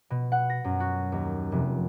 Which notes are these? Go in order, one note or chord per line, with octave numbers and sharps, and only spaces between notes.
B2
F#5
A#6
F#2
F#4
D#2
F1